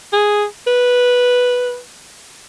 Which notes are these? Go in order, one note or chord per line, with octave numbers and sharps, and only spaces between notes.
G#4
B4